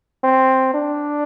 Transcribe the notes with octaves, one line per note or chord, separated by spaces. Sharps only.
C4
D4